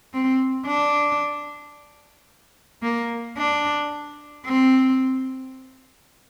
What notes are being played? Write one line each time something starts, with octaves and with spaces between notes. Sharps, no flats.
C4
D4
A#3
D4
C4